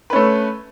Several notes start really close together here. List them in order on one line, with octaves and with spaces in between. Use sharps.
B4 C#4 A3